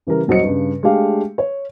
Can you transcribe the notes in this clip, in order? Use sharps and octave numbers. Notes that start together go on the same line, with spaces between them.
C#3 E3 G3 A#4
D#1 F#3 C5 D#5 C#7
G2 C#3
G#3 A3 D4 G4 F5
C#5